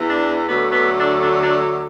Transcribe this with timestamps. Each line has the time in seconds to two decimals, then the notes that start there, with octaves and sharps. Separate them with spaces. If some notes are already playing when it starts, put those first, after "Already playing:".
Already playing: E2 E3
0.09 D4
0.47 D2 D3 F#3 A3 B3
0.72 B3
0.98 D4
1.22 D4
1.41 D4